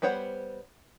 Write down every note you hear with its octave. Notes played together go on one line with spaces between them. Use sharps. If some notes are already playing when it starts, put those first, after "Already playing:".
G3 B3 C5 C#5 F#5